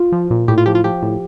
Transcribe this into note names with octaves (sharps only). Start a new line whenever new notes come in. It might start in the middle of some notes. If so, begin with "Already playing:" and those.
Already playing: F4
F3
A#2
A2 G4
F4
F3 G4
F4
F3 G4
A2